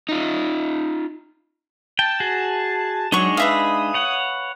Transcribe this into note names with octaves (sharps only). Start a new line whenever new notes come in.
D#4 F4
G5 A5
F#4 G#4
F#3 G#3 D4 D#4 C#5 F#5 C#6
B4 E5 F5 D#6
C#5 F#5